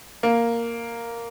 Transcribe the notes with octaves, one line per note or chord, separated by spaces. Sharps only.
A#3